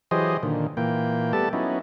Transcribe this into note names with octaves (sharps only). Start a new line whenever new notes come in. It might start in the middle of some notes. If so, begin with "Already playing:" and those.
E3 F#3 G4 G#4 C5 D#5
A#2 D3 D#3
A#2 E3 A#3 G5
G3 A3 B3 G4 A4 A5
F#3 B3 C#4 D#4 E4